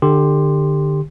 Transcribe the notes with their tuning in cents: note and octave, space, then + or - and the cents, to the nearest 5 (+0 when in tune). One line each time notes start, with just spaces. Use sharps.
D3 +25 G4 +10 C6 +0